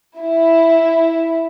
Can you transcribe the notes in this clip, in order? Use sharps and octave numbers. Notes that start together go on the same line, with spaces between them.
E4